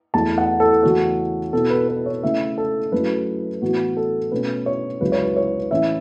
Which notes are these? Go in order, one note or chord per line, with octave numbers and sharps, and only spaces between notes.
E2 E3 A3 E4 A5
F#5
A4
E2 C#3 E3 A3 C#4 F#4
B2 B3 E4 A4
B4
B4
C#5
C#3 A3 C#4 E4 E5
A4
F#2 F#3 A3 C#4 E4 B4
A2 E3 B3 E4 F#4
A4
B2 A3 C#4 B4
C#5
C#2 C#3 F#3 C#4 E4 B4
C#5
B4
C#5
A2 E3 C#4 E4 E5